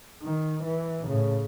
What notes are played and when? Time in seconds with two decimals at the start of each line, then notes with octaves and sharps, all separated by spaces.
0.22 D#3
0.63 E3
1.07 A2 C#3